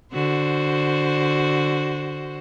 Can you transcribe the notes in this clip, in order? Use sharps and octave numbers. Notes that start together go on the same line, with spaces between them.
D3 F#4 C5